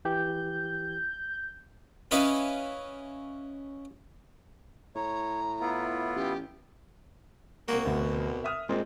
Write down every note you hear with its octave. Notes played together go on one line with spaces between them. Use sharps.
E3 G4 G6
C#4 E4 B4 D#5 F5 B5
A2 C#5 A#5
B3 E4 F4
A1 G4
C2 A#3 F#4
D2 B2
E5 D#6 F6
A#2 G#3 C4 G#4